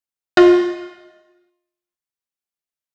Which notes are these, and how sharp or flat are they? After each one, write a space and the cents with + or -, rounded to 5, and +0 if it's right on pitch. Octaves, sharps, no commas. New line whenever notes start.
F4 +20 D#5 +0